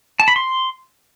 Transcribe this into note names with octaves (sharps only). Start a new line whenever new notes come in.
A5
B5
C6